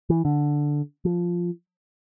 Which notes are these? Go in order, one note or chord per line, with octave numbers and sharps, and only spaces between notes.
E3
D3
F3